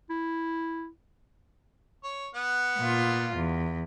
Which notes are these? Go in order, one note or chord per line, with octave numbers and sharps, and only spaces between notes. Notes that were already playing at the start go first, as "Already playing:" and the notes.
E4
C#5
B3 F#5
A#2 F4
E2